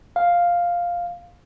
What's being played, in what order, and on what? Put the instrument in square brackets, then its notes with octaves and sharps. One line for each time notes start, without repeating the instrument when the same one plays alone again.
[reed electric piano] F5